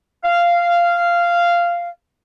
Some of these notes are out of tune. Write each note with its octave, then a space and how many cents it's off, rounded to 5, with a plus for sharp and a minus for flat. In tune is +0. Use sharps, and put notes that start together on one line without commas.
F5 -10